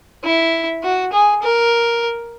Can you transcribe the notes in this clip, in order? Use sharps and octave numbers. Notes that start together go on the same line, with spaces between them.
E4
F#4
G#4
A#4